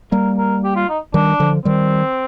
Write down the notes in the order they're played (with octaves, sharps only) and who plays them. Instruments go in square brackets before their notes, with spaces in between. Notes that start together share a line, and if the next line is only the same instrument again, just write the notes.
[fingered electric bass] G3 A#3 [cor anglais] A#4
[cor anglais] A#4
G4
F4
D#4
[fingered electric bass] D#3 G3 [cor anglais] D4
[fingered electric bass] D3 F3
[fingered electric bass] D#3 G3 [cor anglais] C4